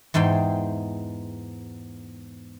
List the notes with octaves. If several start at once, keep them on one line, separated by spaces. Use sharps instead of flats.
E2 G#2 G#3 G5 C6